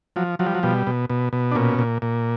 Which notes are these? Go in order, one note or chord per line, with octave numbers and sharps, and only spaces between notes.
F3 F#3
F3 F#3
G3
F#3
B2 G3
B2
B2
B2
D4
A#2 C#4
A#2
A#2